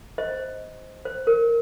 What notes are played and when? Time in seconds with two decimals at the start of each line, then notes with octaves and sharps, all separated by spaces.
0.18 C5 D#5
1.05 C5
1.27 A#4